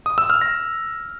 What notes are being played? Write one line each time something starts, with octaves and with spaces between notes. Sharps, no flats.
D#6
E6
F6
A#6